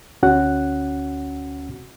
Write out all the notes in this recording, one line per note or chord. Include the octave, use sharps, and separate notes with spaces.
D2 C#4 F#4 F#5